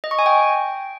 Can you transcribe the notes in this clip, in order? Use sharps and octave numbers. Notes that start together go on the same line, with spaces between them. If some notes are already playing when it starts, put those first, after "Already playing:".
D#5
C#6
G#5
G5